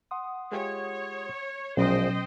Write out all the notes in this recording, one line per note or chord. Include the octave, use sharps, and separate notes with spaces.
F#5 C6 D#6
G#3 F4 G4 C#5
A#1 B2 F#3 G#3 C#4 C5 D#5 G5